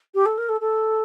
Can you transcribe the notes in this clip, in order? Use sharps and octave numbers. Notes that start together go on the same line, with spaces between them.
G4
A4
A#4
A4
A4